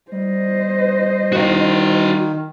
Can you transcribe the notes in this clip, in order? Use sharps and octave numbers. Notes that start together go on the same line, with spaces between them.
G3 C5 D#5
D#3 F#4 F5